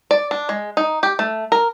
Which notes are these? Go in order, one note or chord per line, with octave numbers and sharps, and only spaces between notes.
D5
D4
G#3
D#4
G4
A3
A#4